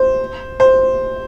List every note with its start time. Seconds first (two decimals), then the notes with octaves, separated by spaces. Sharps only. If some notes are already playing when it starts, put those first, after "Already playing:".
Already playing: C5
0.60 C5